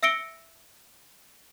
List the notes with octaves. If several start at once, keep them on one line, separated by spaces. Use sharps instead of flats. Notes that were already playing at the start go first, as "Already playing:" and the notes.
E5 E6 A#6 C#7 D7 G7